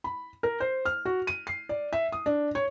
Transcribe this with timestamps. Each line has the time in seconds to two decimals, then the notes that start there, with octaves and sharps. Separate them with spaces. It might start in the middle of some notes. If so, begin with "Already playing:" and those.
0.04 B5
0.43 A#4
0.60 C5
0.85 F6
1.05 F#4
1.27 D#7
1.47 C7
1.69 D5
1.93 E5
2.12 D#6
2.26 D4
2.55 C#5